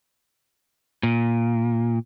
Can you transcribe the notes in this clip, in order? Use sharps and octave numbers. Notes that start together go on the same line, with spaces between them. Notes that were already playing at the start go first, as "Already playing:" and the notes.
A#2